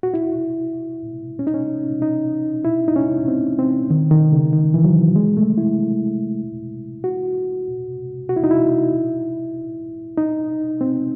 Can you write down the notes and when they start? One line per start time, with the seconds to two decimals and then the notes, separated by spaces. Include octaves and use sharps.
0.03 F#4
0.14 E4
1.39 C#4
1.47 D#4
1.54 C#4
2.02 D#4
2.65 E4
2.88 D#4
2.96 C#4
3.28 C4
3.59 C4
3.90 D#3
4.11 D#3
4.32 C#3
4.53 D#3
4.74 E3
4.84 F#3
5.16 G#3
5.37 A3
5.57 E4
7.04 F#4
8.29 F#4
8.36 E4
8.44 D#4
8.51 E4
10.18 D#4
10.81 C4